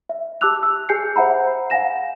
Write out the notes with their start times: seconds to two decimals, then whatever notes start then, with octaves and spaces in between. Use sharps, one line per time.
0.09 E5
0.41 G4 A5 D6 E6 F#6 F7
0.63 E6
0.89 G4 G#4 G#5 G6 C7 C#7
1.16 C5 E5 F#5 A#5 B5
1.70 F5 F#5 G#5 A#6 E7